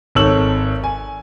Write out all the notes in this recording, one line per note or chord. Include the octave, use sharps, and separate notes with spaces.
G#1 D#4 A4 C#5 E6 F#7
G#5